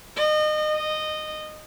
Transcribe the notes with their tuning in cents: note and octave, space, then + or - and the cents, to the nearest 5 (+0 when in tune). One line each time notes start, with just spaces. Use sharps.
D#5 -30
D#5 -15